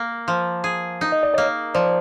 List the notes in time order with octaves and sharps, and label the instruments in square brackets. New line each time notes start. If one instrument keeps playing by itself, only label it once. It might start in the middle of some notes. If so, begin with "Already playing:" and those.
Already playing: [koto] A#3
F3
G#4
D#4
[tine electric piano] D#5
D5
[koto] A#3 [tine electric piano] C#5 D#5
[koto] F3 [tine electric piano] C5 D5